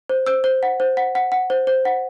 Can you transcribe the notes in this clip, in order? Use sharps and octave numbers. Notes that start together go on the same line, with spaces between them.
C5
C5 E6 G6
C5
F#5
C5
F#5
F#5
F#5
C5
C5
F#5